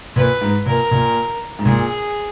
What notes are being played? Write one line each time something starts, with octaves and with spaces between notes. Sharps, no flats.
A#2 B4
G#2
A#2 A#4
A#2
G#2
A#2 G#4